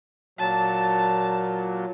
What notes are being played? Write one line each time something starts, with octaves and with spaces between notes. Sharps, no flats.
A#2 F#3 A5